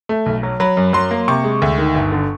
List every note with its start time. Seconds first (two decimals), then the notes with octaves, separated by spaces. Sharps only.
0.09 A3
0.26 B1
0.43 F#3
0.60 F#3 B5
0.77 F#2
0.93 F#3 C6
1.11 A#3
1.28 C3 C#6
1.44 G#3
1.62 D2
1.78 D#3
1.95 G1
2.12 D3